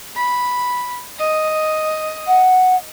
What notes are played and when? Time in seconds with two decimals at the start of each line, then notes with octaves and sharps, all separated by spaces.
0.16 B5
1.19 D#5
2.27 F#5